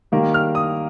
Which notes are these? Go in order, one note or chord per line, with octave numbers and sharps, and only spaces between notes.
D#3 G3 A#3
F6
D#6